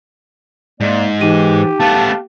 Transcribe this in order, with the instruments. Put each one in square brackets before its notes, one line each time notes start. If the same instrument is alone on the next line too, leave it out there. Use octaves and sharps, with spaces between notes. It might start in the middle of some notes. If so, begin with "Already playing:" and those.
[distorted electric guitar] G#2 [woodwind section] A#3 D5
[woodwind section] E3 [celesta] D#4 D#7 [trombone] G4
[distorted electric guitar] A3 B3 [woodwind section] F5 A5